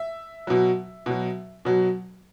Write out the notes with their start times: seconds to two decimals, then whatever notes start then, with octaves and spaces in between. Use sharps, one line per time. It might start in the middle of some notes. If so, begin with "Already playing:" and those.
Already playing: E5
0.47 B2 F#3
1.06 B2 F#3
1.65 B2 F#3